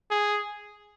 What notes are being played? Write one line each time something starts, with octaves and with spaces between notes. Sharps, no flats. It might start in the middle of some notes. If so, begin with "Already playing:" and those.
G#4